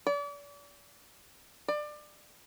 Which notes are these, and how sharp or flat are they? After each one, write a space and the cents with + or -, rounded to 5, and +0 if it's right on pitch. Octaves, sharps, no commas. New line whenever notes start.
D5 -40
D5 +25